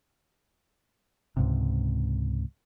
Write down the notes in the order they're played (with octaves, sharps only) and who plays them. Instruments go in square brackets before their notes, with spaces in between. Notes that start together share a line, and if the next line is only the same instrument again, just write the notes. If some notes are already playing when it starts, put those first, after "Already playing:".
[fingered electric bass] C#2 G#2 C3